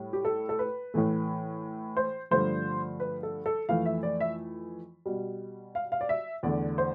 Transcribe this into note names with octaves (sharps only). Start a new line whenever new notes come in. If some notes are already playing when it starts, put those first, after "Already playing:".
Already playing: A2 G3
G4
A4
A4
B4
A2 E3 A3
C5
G2 D3 F3 A3 C5
B4
A4
A4
F2 E3 A3 F5
E5
D5
E5
B2 G3
F5
F5
D5
E5
E2 D3 A3 D5
C5